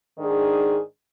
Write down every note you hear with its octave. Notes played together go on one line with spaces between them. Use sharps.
G#2 D#3 D4 G#4